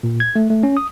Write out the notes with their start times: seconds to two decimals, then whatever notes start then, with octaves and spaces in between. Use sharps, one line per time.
0.03 A#2
0.20 G#6
0.36 A3
0.50 A3
0.63 C#4
0.77 D#6